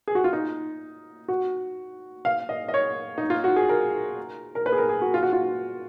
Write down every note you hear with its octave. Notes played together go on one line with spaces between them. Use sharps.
G#4
F#4
F4
D#4
F#4
F5
D#5
D#5
C#5
D#4
F4
F#4
G#4
A#4
A#4
B4
G#4
A#4
G#4
F#4
F4
F#4
F4